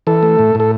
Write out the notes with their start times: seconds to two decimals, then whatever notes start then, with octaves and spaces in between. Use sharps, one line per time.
0.07 E3 A4
0.23 A3
0.39 A2
0.55 A2 A4